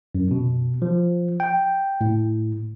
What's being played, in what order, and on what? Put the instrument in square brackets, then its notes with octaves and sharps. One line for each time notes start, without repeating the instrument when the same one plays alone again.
[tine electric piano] F#2
B2
F3
G5
A2